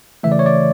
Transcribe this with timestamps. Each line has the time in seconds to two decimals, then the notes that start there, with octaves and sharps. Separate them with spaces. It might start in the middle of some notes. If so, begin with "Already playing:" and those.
0.23 C#3 E3 A3 E5
0.32 D5
0.39 C#5
0.46 D5